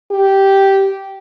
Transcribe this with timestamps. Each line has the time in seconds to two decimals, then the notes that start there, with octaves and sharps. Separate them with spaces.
0.11 G4